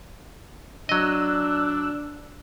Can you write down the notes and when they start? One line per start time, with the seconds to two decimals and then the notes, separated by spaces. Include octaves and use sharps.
0.89 F#3 D4 D#5 E6 F#6